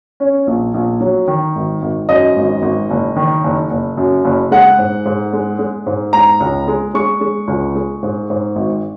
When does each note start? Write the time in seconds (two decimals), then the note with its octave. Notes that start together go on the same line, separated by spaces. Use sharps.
0.20 C#4
0.47 A#1
0.74 A#1
1.01 F#3
1.28 D#3
1.56 G#1
1.82 G#1
2.09 F#2 D#5
2.36 G#1
2.62 G#1
2.91 F#1
3.16 D#3
3.44 F#1
3.71 F#1
3.97 F#2
4.25 F#1
4.51 G#3 F#5
4.79 G#2
5.06 G#2
5.33 G#3
5.59 G#3
5.86 G#2
6.13 G#3 A#5
6.40 C#2
6.68 G#3
6.94 G#3 C#6
7.21 G#3
7.48 C#2
7.75 G#3
8.03 G#2
8.30 G#2
8.56 G#1